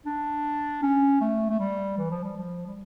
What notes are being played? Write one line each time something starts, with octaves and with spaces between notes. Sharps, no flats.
D4
C#4
A3
A3
G3
E3
F3
G3
F3
G3